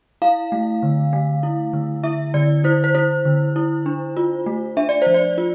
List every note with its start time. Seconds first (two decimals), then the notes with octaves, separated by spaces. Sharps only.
0.22 E4 F5
0.52 A3
0.83 D3
1.13 A3
1.43 E4
1.73 D3
2.04 E4 E5
2.34 D3 D5
2.64 E4 C5
2.84 C5
2.95 E4 C5
3.25 D3
3.56 E4
3.86 D4
4.17 F4
4.46 A3
4.77 D4 E5
4.89 D5
5.02 F3 C5
5.14 D5
5.38 F4